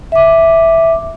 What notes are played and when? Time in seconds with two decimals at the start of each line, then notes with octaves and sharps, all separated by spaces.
0.12 E5 D6